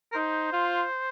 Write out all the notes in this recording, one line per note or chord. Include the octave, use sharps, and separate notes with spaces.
A#4
D#4 C5
F4